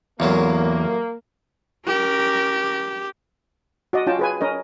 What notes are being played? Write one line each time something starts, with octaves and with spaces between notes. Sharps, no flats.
A1 E2 C#3 F#3 A#3
C#4 G4 A#4
F#4 D5 D#5
C#4 F4 G5 A5
G#4 B4 G#5
C#4 A#4 D#5